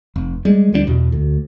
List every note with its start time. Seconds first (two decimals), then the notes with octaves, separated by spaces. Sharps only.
0.16 F1
0.45 G3 G#3
0.73 D2 G3 B3 D4
0.87 E2 B2
1.12 D2